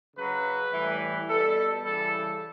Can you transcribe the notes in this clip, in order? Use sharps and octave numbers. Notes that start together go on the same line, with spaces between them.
C#3 F#3 B4
A2 E3 G3
B2 G3 A4
C#3 E3 G3 A4